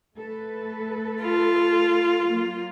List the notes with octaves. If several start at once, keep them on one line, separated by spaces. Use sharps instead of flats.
A3 A4 B4
F4
F#3 A#3